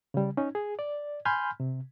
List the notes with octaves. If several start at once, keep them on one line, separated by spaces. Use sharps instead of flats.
C#3 G3
C#4 D#4
G#4
D5
G#5 B5 C6 F6 G6
C3